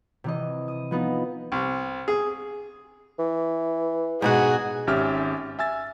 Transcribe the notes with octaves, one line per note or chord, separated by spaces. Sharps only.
C3 E3 D#5
D#6
F3 B3 D#4
C2
G#4
E3
G#2 B2 F#4 G#4 F#5
G#1 C#4 G4 E5 F6
E5 G#5 E6 A6